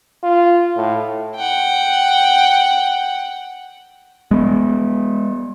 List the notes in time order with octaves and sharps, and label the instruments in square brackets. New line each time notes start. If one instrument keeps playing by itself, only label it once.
[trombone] F4
A2
[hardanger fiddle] F#5 G5
[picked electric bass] G#3 B3